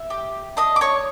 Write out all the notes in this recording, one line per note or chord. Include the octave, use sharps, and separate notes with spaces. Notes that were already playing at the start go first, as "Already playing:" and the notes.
Already playing: E5
G4
D4 D#5 D#6
D6
C#5 C#6